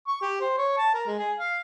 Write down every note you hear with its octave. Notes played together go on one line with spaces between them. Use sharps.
C#6
G4
C5
C#5
A5
A#4
G#3
G#4
F5